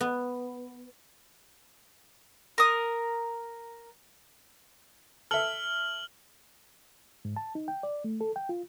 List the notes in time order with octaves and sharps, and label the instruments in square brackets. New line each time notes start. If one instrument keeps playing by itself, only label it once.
[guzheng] B3
[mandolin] A#4 D#6
[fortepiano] A4 E5 [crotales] F6 F#7
[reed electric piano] G#2
A5
D#4
G5
D5
A3
A4
G5
F4